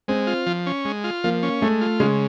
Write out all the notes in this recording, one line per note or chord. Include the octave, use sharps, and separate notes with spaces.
G#3 C4
F4
F3
C#4
G#3
F4
F3 A#3
C#4
G#3 A3
F4
C#3 G#3